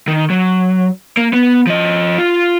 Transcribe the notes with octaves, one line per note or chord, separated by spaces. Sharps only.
D#3
F#3
A#3
B3
F3 D#5
F4